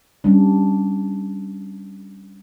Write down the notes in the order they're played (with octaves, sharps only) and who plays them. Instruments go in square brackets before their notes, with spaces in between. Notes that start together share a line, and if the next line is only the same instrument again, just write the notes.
[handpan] G3 C#4 D4